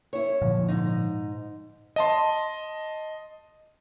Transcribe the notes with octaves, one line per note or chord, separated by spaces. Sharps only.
E4 C#5
A#2 D3 F3
G#2 D#4
D#5 A5 C6